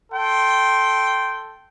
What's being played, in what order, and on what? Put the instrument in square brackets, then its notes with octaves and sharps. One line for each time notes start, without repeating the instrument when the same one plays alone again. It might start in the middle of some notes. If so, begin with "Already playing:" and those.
[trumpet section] A4 G5 C6